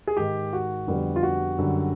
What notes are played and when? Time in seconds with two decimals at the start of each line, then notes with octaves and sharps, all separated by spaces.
0.07 G#4
0.17 G#2 D#3 G#3 G4
0.53 F#4
0.87 F2 D3 G3 B3
1.16 F4
1.23 F#4
1.58 F#2 D3 G3